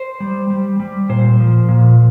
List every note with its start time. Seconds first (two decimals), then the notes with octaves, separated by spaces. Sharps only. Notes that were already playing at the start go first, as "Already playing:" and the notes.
Already playing: C5
0.20 G3
0.50 G3
0.80 G3
1.09 A#2 C5
1.40 F3
1.69 A#2